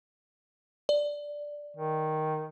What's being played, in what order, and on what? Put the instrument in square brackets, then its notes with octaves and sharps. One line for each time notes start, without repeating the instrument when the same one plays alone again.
[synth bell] D5
[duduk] D#3